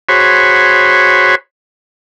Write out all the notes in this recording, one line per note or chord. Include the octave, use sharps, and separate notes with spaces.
F#4 G#4 C5 C#5 B5